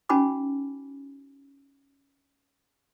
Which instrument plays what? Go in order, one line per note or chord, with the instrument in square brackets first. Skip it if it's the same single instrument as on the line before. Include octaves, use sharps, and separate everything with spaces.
[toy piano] C#4 D#4 F#4 G#5 B5 D6